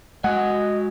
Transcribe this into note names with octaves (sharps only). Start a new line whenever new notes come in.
G#3 F#4 D#5 F#5 G#5